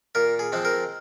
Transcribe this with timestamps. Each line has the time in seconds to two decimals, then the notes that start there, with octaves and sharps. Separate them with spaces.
0.15 A#2 A#4
0.39 G#4
0.52 F3 G#3 C4
0.65 A#4